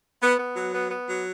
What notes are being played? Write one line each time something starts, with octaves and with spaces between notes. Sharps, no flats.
B3
B3
F#3
B3
B3
F#3